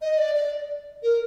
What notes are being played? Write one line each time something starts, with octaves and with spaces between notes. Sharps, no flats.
D#5
D5
D5
A#4